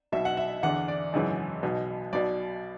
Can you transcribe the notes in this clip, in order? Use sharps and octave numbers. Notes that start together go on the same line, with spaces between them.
B1 B2 E5
F#5
E5
E2 D3 F#5
D5
G#1 F#2 C#3 E3
B1 B2
B1 B2 D5